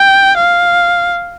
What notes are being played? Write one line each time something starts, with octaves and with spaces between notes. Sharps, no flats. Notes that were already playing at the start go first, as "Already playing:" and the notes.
Already playing: G5
F5